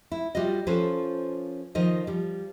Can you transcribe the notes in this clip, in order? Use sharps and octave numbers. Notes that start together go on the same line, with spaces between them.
E4
G3 F4 F#4 D#5
F3 C#4 F4 A4 B4 C5
D#3 F3 D#4 D#5
F3 G3